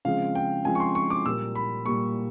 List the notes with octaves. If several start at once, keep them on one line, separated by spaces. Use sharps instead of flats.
C#3 F3 G#3 C4 F5
G5
C#3 F3 G#3 C4 G#5
C#6
C6
C#6
D6
A#2 G3 A#3 E6
B5
A#2 G3 A#3 C#6